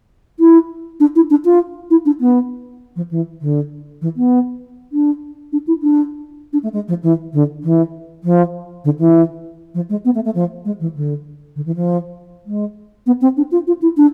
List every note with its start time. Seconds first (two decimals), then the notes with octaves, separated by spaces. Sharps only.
0.40 E4
1.00 D4
1.15 E4
1.30 D4
1.45 F4
1.90 E4
2.05 D4
2.21 B3
2.96 F3
3.11 E3
3.41 D3
4.01 E3
4.17 B3
4.92 D4
5.52 D4
5.67 E4
5.82 D4
6.53 D4
6.63 A3
6.73 G#3
6.88 F3
7.03 E3
7.33 D3
7.63 E3
8.24 F3
8.84 D3
8.99 E3
9.74 F3
9.90 G#3
10.05 B3
10.15 A3
10.25 A3
10.35 F3
10.65 G#3
10.80 E3
10.95 D3
11.56 D3
11.66 E3
11.76 F3
12.46 G#3
13.06 B3
13.21 C4
13.37 D4
13.51 F4
13.67 F4
13.82 E4
13.97 D4